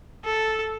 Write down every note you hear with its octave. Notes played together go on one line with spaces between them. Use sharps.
A4